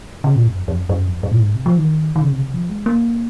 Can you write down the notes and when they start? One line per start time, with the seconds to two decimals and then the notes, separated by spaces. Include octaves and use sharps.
0.24 C#3
0.35 A#2
0.47 F#2
0.58 F2
0.68 F2
0.79 F#2
0.89 F#2
1.06 F2
1.23 F#2
1.31 A#2
1.40 G#2
1.55 C3
1.66 F3
1.77 D#3
2.16 D#3
2.21 C#3
2.32 C3
2.38 C#3
2.42 C3
2.54 F3
2.70 G#3
2.86 A#3